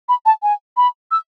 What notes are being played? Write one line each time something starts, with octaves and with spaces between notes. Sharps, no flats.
B5
A5
G#5
B5
E6